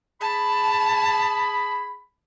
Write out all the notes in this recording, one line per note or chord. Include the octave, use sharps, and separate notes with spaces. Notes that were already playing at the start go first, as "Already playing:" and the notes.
G#4 A5 B5